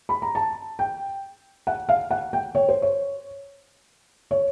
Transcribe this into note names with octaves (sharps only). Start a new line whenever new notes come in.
B5
A#5
A5
G5
F#5
F5
F#5
G5
C#5
C5
C#5
C#5